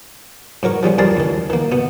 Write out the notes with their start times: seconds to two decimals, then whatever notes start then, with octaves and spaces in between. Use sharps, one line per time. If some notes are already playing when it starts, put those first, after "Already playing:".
0.63 G#2 F#3 A#4 C#6
0.83 F3 G3 G#3 C#4
0.98 F2 G3 G#4 A#4 A5 C6
1.17 D2 D#3
1.50 D#3 A#3
1.72 B2 B3